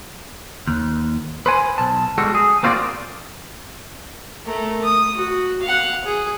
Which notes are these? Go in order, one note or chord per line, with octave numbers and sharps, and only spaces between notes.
D#2
B4 C5 G#5
B1 A5
G3 G#3 F#4 A4
G#4
A#3 C4 F4 F#4 G#4 D5
A3 A#4
D#6
F#4
F5 F#5
G#4